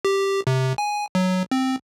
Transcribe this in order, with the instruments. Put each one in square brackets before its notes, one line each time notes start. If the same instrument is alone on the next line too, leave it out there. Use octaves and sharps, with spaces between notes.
[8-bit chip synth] G4
C3
G#5
F#3
C4